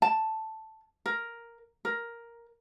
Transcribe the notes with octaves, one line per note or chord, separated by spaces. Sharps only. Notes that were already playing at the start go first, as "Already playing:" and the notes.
A5
A#4
A#4